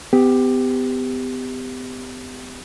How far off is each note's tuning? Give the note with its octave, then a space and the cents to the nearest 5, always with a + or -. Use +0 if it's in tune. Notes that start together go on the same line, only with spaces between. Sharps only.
B3 +40 G4 +10